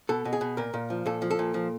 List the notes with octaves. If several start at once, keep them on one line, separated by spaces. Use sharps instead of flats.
B2 A4
B2
G#4
B2
A#2 A#4
A#2
F3
A#2 A4
F3
A4
A#2
F3